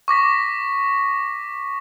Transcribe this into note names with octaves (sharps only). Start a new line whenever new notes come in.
C#6 D6 A#6 B6